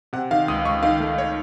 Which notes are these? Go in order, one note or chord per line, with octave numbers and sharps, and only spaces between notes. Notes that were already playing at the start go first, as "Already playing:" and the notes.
C3 F#5
D#3 F5
C#2 D#6
C#2 C#6
D#3 F5
A3
C#5